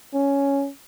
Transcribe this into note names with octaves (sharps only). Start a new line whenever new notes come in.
C#4